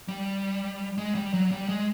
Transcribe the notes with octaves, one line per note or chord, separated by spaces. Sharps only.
G3
G#3
G3
F#3
G3
G#3